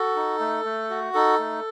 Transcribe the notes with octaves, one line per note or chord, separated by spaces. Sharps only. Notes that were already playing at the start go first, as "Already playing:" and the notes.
Already playing: F#4 A4
D#4
A3
A3
F#4
D#4 A4
A3